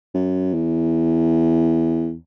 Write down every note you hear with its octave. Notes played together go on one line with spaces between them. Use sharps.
F#2
E2